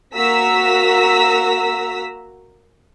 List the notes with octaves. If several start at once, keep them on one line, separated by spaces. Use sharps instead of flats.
A#3 F#4 A#5 E6 B6